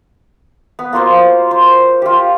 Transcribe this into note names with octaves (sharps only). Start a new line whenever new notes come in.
B3
A#3 F4 F#4 C5
C5
F4 G4